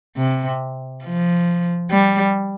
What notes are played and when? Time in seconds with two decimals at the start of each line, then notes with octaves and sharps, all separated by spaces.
0.17 C3
1.04 F3
1.91 G3